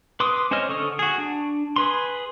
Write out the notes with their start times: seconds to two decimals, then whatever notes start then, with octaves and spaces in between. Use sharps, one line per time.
0.20 B4 C6 D6 D#6
0.51 C#4 C5 C#5 D#5 F6
0.69 D3 A4 C#6 D#6 F6
0.99 F#4 G#4
1.18 D4
1.76 G#4 B4 C6